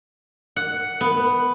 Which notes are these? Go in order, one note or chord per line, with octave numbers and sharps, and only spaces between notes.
F#5
B3